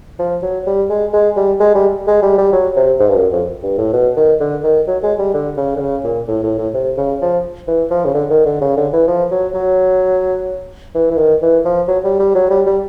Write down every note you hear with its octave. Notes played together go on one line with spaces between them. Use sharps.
F3
F#3
G3
G#3
G#3
G3
G#3
G3
G#3
G3
G3
F#3
C3
G#2
G2
F#2
F2
G2
A2
B2
D#3
D3
D#3
F#3
G#3
G3
D3
C#3
D3
C#3
A#2
A2
A2
A2
C3
C#3
F3
E3
F3
C#3
D3
D#3
D3
C#3
D3
E3
F3
F#3
F#3
E3
E3
D#3
E3
F3
F#3
G3
G3
F#3
G3
G3